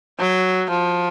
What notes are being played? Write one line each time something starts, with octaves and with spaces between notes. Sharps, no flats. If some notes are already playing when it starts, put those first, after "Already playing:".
F#3
F3